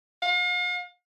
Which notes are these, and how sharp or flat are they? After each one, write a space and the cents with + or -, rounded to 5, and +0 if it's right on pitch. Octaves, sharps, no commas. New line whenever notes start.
F5 +45